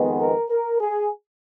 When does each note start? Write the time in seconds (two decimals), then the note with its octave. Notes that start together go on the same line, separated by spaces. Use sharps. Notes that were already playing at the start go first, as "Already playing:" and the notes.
Already playing: F2 D#3 G#3 B3
0.19 A#4
0.49 A#4
0.81 G#4